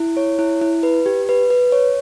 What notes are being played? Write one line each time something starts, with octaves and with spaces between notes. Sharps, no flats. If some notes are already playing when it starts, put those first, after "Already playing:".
Already playing: E4
C#5
E4
E4
B4
G4
B4
B4
C#5